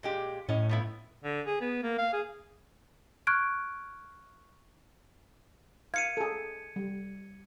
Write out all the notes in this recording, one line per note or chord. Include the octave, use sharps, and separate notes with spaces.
A#2 G#3 G4
A2 C#4 D#5
F3 B3 E4
D3
G#4
B3
A#3
F5
G#4
C#6 F6 F#6 G#6 D7
F5 G#6 C#7 D#7
G#4 A4
G3